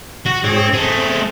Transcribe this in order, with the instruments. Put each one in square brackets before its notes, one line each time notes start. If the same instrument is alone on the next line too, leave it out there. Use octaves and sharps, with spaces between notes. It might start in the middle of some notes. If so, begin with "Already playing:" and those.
[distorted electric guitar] F#4
[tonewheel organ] G#2 G#4 C#5 [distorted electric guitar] C4
[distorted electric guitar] A3 G#4 [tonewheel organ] C4